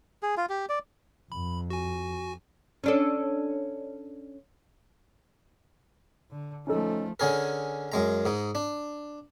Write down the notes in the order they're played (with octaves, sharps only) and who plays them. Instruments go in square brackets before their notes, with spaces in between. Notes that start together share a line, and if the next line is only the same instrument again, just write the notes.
[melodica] G#4
F4
G4
D5
[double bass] F2 [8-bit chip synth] B5
[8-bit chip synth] F#4 G#5
[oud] C#4 D4 A4
[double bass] D3
[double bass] F3 A3 [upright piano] C#4 D#4 A4
[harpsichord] D3 C#4 G#4 A#4
F#2 G#3 A#5
G#2 D#4
D4